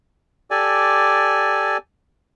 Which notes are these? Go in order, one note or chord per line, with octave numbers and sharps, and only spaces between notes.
G4 A4 D5 G#5